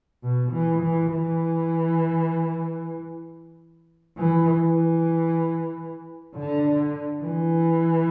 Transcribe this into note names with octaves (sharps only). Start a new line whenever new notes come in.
B2
E3
E3
E3
E3
E3
D3
E3